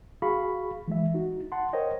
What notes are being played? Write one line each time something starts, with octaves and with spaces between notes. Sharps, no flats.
F#4 G#4 F5 B5 C#6
E3 G#3 E5
D#4 F#4
F#5 A5 C6
A#4 C5 C#5 D#5 G5